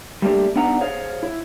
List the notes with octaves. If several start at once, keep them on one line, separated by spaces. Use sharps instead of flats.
G3 A3 A#3 D4 G4
B3 D4 D#4 F#5 A#5
G#4 C5 C#5 F5
E4